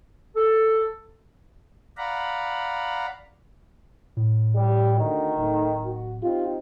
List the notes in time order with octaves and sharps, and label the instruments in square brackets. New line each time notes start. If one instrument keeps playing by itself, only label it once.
[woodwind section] A4
[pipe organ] D5 F5 F#5 A#5 B5
[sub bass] A2
[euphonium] G3 [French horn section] G4
[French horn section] D2 D3 [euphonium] D#3
[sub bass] D1 [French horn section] A2 A3 D#4
[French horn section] F#4
[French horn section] C4 D#4 G4 [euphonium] F4